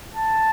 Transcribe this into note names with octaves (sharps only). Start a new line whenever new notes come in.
A5